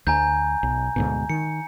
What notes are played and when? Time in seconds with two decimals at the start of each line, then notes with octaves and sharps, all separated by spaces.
0.07 D2 G#5 A#5 G6
0.63 B1
0.96 D2 G#2 B2
1.29 D#3 C#7